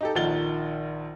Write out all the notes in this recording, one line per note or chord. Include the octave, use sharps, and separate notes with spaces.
D#4 G4 A4
A#1 D#3 F3 F#5 A6 G7